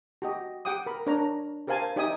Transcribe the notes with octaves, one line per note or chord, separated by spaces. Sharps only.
F#4 G4 D#5
G4 F#5 G5 D6 D#6
A#4 B5
D4 A#4 C#5 A#5
G4 A#4 C5 F5 G#5 A5
D#4 G4 D5 E5 G#5 D#6